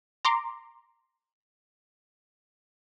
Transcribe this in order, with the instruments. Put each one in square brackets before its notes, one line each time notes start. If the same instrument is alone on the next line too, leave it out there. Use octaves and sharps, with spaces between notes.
[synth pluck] A#5 C6 D6